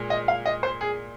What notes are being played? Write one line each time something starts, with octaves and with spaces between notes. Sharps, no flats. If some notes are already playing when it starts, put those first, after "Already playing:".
Already playing: A#2 G#3
D#5
F5
D#5
C5
G#4